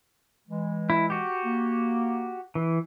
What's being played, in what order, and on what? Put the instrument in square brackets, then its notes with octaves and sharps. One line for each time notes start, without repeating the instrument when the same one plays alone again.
[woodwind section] E3 G#3
[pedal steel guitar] E4
F#4 G4
[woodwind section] A#3
[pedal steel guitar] E3